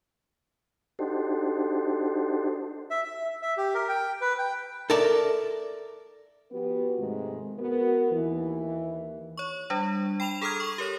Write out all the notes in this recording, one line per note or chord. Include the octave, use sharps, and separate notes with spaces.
D4 D#4 F#4 G4 A4 C5
E5
E5
E5
G4
A#4
G5
B4
G5
A4 A#4 D5 E5
F3 B3 F#4 G4 B4
G#2 C3 D#3 G#3 A3 C4
B3 F#4 A#4
D#2 E3
C#5 C#6
G3 D4
G5 B5 E7 F7
G#4 A4 A#5 D#6 F6 G#6
C#6 F7
G4 A#4 C#5 A#6